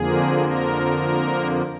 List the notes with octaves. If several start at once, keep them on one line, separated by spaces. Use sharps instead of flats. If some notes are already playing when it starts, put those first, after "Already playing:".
Already playing: F2 D3 F3 A#3 G#4
A#4